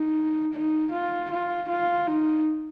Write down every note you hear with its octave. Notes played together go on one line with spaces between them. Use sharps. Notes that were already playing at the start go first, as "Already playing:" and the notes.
Already playing: D#4
D#4
F4
F4
F4
D#4